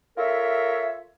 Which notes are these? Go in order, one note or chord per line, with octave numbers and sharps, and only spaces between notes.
F4 A4 A#4 C#5 E5